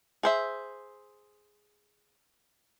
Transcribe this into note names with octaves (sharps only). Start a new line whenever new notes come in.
G#4 C5 E5